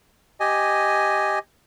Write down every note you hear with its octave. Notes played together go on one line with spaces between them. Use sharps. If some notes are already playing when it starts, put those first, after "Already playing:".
G4 D#5 G#5